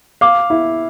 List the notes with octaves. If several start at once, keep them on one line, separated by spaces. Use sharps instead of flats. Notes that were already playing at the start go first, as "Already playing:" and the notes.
F5 D6
E4